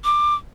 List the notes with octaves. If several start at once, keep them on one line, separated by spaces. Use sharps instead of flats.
D6